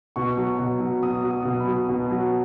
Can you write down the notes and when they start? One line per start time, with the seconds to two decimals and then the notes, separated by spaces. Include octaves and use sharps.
0.16 B2 C#6
0.37 F#3
0.59 B2
0.80 F#3
1.03 B2 D#6
1.24 F#3
1.31 D#6
1.45 B2
1.60 B5
1.67 F#3
1.89 B2
2.11 F#3